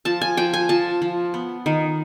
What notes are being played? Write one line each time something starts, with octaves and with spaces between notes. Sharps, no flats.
F3 A5
G#5
F3 G5
G#5
F3 A5
F3
B3
D#3